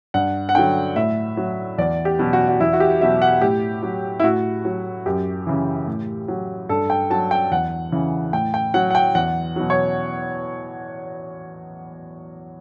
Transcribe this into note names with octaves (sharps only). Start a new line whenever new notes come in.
G2 F#5
F#5
D3 F#3 G5
A2 E5
F#3
E2 D5
G4
B2 F#3
F#4
F#4
E2 E4
F#4
G4
B2 F#3 E5
F#5
A2 G4
F#3
E4
A2 F#4
F#3
F#2 G4
C#3 E3
A2
F#3
G2 A4
G5
F#3 A5
G5
E2 F#5
C#3 E3
A2 G5
G5
F#3 F#5
F#5
G5
E2 F#5
B2 F#3
C#5